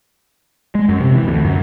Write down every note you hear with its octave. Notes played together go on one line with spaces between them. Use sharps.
G#3
F#2
C3
E3
D2
F#2